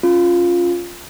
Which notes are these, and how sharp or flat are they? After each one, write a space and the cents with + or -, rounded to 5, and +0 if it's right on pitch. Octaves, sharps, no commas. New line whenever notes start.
C#4 +0 F4 +0